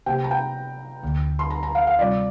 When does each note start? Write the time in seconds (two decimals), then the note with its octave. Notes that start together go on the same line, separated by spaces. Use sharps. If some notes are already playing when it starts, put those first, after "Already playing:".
0.06 C3 A#3 G4 C5 G5
0.24 A#5
0.31 G5
1.03 D2 D3 A#3
1.39 C6
1.50 A#5
1.63 A#5
1.75 F5
1.87 F5
1.99 C3 G3 C4 F4 D5